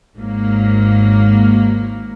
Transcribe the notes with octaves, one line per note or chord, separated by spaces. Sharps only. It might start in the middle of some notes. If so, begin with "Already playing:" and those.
G#1 G#2 F#3 A#3